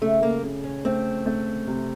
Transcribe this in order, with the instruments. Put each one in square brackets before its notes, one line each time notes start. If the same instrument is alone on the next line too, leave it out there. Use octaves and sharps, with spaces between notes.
[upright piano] C#3 [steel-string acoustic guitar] A3
[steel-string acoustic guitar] A#3
[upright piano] C#3
[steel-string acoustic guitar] C#4
[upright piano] A3 [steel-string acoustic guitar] C4
[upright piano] A3
C3